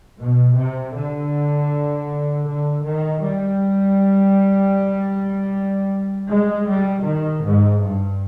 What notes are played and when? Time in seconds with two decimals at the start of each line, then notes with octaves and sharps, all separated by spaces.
0.20 B2
0.58 C3
0.96 D3
2.47 D3
2.86 D#3
3.25 G3
6.29 G#3
6.68 G3
7.06 D#3
7.44 G#2
7.82 G2